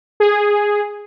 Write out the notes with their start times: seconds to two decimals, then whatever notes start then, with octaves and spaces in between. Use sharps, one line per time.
0.20 G#4